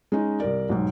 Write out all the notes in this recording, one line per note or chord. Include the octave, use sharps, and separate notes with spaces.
G#3 C#4 D#4
C2 A#4 D5
B1 G#2